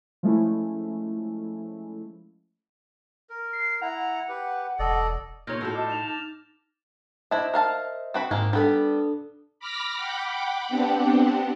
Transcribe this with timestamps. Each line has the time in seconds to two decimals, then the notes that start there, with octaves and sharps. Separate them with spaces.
0.23 F3 G#3 A3 C#4 E4
3.30 A#4
3.53 C7
3.81 E4 F#5 A#5
4.29 G4 B4
4.79 E1 A4 D5 D#5
5.47 A#2 D#4 C#5 F6 G6 A#6
5.61 A2 F3 F#4 A4
5.75 D#5 A5 D6
5.90 D#4 E7 F7
6.08 A6
7.31 D4 E4 C5 D#5 E5
7.54 A#4 F5 A5
8.14 C4 F#4 B5
8.31 G#2 G#3 A#3 C4
8.53 G3 B3 D4 A4 B5
9.60 B5 D6 F6 A#6 B6
9.96 F#5 G5 B5 D6
10.68 B3 C4 D4 G4 F#5